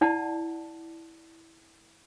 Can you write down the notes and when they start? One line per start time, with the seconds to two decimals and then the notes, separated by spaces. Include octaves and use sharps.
0.01 E4 D5 F#5 A5